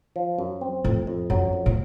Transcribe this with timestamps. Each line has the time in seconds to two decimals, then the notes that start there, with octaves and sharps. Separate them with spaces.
0.16 F3
0.39 F#2
0.61 C4
0.84 F2 A2
1.07 F2
1.30 F#2 F#3
1.53 F2
1.66 A2